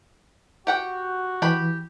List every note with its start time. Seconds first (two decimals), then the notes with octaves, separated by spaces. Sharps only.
0.67 F#4 G4 F#5 G5
1.42 E3 G4 B5